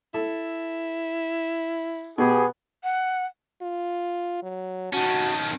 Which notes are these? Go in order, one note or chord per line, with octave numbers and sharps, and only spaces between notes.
E4 A4
B2 B3 G4 G#4
F#5
F4
F#3
D#3 C#4 F#4 A5